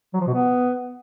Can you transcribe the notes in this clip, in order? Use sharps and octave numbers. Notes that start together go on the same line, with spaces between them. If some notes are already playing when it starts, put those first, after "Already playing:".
F#3
F3
B2
B3